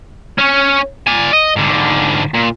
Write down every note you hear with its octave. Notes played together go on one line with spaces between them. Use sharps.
C#4 C#5
D5 G#5
D#5
G#2 D3
A#2